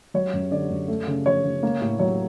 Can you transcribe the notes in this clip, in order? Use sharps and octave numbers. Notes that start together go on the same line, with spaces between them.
F#3 C#5
F#2
D3 D5
F#2
A3
C#3
F3 C#5
C#3
A#3
A2
F#3 C#5